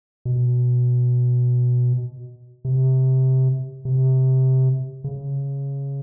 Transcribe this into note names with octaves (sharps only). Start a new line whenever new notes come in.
B2
C3
C3
C#3